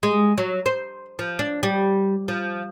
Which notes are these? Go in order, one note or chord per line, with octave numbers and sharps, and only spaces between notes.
G#3
F#3
C5
F3
D4
G3
F3